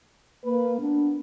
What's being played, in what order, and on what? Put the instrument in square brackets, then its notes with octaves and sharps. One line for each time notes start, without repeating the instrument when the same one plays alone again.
[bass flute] A#3 [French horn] B4
[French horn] B3 [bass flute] D4